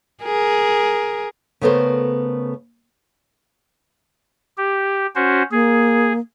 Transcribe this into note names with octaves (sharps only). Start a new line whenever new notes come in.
G#4 A#4
C#3 A3 B3 A4 A#4 C5
G4
C#4 F#4 C5
A#3 G#4